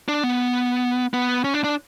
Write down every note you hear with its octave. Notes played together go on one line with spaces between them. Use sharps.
D4
B3
B3
C#4
D4
D4